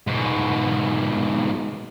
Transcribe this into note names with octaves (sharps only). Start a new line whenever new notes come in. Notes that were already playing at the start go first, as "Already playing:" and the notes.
G#2 B2